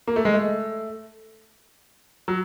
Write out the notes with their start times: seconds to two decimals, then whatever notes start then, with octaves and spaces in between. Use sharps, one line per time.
0.07 A#3
0.16 A3
0.25 G#3
0.34 A3
2.28 F#3